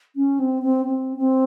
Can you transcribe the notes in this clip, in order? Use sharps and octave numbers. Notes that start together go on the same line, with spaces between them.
C#4
C4
C4
C4
C4